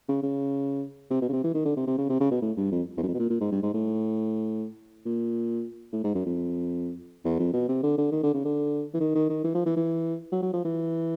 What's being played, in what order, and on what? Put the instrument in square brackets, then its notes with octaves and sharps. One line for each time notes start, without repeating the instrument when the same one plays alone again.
[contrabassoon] C#3
C#3
C3
B2
C#3
C3
E3
D#3
D3
C3
C3
C#3
C3
C#3
B2
A2
G2
F2
E2
F#2
F2
B2
A#2
A#2
G#2
G2
G#2
A2
A#2
A2
G#2
F#2
F2
E2
F2
B2
C3
D3
D3
D#3
D3
C#3
D3
E3
D#3
D#3
D#3
E3
F3
E3
E3
F#3
F#3
F3
E3